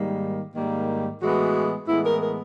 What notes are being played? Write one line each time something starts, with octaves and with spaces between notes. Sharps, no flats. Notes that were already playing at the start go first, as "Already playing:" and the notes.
Already playing: G#2 D#3 G3 A#3
G#2 D#3 G3 A#3
A2 E3 G#3 B3 F#4
A2 E3 G#3 B3 E4
A#4
A#4